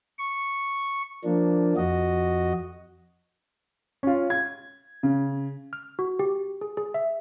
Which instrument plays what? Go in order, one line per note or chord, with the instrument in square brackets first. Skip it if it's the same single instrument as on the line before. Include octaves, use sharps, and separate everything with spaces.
[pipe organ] C#6
F3 A#3 D4
F2 F#4 D#5
[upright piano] C#4 F4
G#6
C#3
[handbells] F6
F#4
G4
G#4
G#4
E5